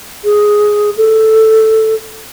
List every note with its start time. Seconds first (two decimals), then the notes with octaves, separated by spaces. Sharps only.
0.24 G#4
0.97 A4